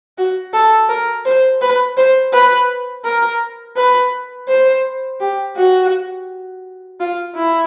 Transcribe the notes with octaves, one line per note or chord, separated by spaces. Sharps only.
F#4
A4
A#4
C5
B4
C5
B4
A#4
B4
C5
G4
F#4
F4
E4